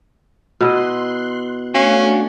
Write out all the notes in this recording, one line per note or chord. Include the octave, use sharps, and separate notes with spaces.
B2 E4 D#5 C6 F#6
A3 C#4 D4 F#4 F5